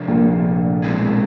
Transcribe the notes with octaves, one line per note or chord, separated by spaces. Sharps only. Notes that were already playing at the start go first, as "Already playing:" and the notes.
Already playing: C3 F3 A3 D4 F4
A#1 A#2
B2 G#3 C4 E4 G#4